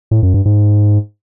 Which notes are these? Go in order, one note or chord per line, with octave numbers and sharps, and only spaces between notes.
A2
F#2
G2
G#2